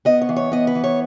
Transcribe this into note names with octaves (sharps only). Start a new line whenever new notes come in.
B3 D#5
C#5
E3
C#5
B3 D#5
B4
E3
C#5